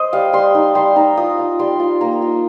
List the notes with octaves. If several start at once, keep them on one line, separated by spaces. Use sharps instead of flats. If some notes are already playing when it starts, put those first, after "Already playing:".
Already playing: C5 D#5
G3 F5
G3 C6
D#4
G3 C6
D#4 A#5
F4 D#6
F4
G3 C6
F4
A#3 A#5
F4